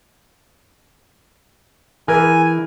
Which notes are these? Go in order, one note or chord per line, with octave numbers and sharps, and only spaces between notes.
E3 G#4 A#4 G#5